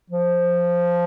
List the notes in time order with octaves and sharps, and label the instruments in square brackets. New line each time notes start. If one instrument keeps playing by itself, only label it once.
[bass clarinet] F3